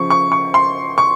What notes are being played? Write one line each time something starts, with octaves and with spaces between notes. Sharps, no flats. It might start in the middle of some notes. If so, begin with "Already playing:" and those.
Already playing: C#3 F3 C#6
C#6
C#6
C6
C#6